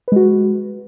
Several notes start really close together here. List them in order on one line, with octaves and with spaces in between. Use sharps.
B4 G#3 F#4